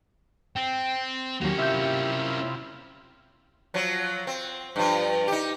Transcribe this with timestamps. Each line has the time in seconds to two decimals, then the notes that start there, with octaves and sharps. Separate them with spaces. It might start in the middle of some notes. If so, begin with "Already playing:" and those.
0.56 C4 G5
1.41 D#2 F#3 A#3 C#4 G4
1.59 C3 E4 F4 E5 G6
3.74 F3 F#3
4.27 C4
4.76 G2 F3
5.28 D#4 G4